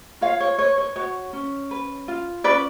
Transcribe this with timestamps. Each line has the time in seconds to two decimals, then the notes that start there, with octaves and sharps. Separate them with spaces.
0.21 F4 C#5 F5
0.40 C#5
0.58 B4 C#5
0.78 C#5
0.96 F#4 C#5
1.33 C#4
1.71 B4
2.08 F4
2.44 C#4 B4 D5